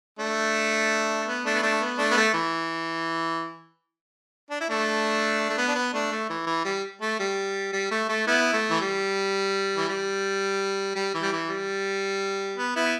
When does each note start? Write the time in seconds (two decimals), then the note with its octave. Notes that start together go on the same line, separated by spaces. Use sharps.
0.19 A3 D4
1.27 B3
1.45 A3 D4
1.54 B3
1.63 A3 D4
1.81 B3
1.98 A3 D4
2.11 B3
2.17 A3
2.34 E3
4.50 D4
4.61 E4
4.70 A3 D4
5.50 A3
5.58 B3
5.68 D4
5.75 B3
5.93 A3 D4
6.12 A3
6.30 E3
6.47 E3
6.65 G3
7.01 A3
7.19 G3
7.73 G3
7.91 A3
8.09 A3
8.27 B3 E4
8.53 A3
8.70 E3
8.80 G3
9.77 E3
9.88 G3
10.95 G3
11.14 E3
11.23 G3
11.32 E3
11.49 G3
12.57 B3
12.76 B3 E4